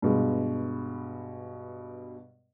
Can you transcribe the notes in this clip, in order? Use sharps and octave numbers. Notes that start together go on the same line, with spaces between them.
G2 B2 G#3